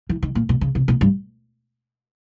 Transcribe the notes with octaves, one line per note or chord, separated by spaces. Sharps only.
E3
D#3
A#2
B2
C#3
C3
B2
G2